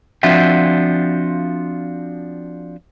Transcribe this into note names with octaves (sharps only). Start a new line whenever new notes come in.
F3 C4 D4 F4 F#4 E5